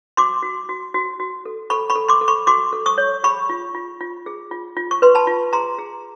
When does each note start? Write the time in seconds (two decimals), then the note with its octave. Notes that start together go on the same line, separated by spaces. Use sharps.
0.17 F#4 C6 D6
0.43 F#4
0.69 F#4
0.94 F#4
1.20 F#4
1.45 A4
1.70 A4 B5 C#6
1.90 B5 C#6
1.96 A4
2.08 C6 D6
2.21 A4
2.28 B5 C#6
2.47 F#4 C6 D6
2.73 A4
2.86 C#6 D#6
2.98 C#5
3.24 G#4 B5 C#6
3.49 F4
3.75 F4
4.00 F4
4.26 G#4
4.51 F4
4.77 F4
4.91 C#6
5.02 B4 C6
5.15 A5 B5
5.27 F4
5.53 G#4 A#5 C6
5.78 G#4